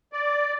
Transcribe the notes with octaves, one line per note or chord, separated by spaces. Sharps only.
D5